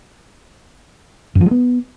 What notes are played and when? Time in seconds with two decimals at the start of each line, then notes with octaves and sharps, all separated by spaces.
1.35 F#2
1.41 F3
1.46 G#3
1.51 B3